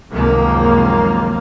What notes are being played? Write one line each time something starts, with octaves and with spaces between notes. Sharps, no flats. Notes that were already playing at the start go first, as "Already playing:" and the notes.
C#2 F#2 C3 D#3 F3 A#3